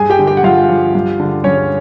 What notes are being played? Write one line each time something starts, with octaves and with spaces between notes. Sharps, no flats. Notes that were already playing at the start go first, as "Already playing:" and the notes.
Already playing: G2 G#4 G#5
G4 G5
D3
G4 G5
F#5
G2 F4 F5
F3
G2
D3
G2 C#4 C#5